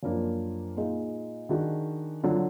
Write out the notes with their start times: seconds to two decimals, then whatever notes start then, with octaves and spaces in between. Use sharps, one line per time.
0.03 F#2 F3 A#3 D4 F4
0.77 A#2 G#3 D#4
1.49 D#3 G#3 D4 F#4
2.24 D3 F#3 D4 F4